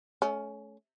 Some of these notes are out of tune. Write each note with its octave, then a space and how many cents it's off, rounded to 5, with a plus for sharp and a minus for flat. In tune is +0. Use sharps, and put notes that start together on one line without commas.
A3 -30 C#4 +10